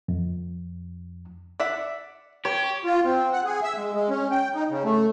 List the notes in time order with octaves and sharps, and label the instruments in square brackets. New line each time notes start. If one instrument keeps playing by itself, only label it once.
[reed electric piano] F2
[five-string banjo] D5 E5 F#5
[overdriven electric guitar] G4 [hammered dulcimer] C#5
[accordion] F4
C4
F#5
G#4
E5
G#3
G#3
C#4
G5
D#4
C#3
A3